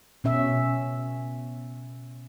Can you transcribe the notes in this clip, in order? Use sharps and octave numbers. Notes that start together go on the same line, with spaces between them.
B2 C#4 E5